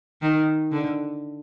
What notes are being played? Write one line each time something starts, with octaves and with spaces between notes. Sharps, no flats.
D#3
D3